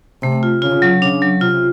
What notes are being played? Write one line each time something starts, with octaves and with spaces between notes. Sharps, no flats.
C3 A3
F4
C#3 F4
F#3
C#3 D4
F#3
C3 F4